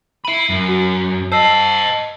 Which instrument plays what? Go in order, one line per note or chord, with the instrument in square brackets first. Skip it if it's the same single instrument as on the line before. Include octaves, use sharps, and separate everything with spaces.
[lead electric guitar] E5 B5 [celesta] C7 D#7
[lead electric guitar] F#2
[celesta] F#4
[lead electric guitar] C5 D#5 [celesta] A5 E6 C7